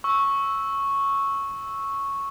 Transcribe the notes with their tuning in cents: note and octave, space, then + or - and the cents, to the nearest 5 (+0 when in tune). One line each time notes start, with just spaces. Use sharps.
C#6 -5 E6 -5